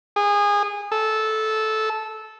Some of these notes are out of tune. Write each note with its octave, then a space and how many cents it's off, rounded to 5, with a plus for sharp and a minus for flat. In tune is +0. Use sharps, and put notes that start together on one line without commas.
G#4 -25
A4 -15